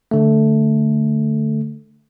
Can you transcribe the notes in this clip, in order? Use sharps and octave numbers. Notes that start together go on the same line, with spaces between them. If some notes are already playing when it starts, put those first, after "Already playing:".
D3 A3